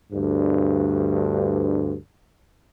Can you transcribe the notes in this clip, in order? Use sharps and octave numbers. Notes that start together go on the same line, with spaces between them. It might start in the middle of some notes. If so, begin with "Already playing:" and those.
D2 G2